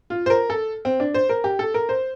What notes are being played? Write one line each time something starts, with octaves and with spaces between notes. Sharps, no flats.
F4
C5
A#4
A4
C4
D4
C5
A#4
G4
A4
A#4
C5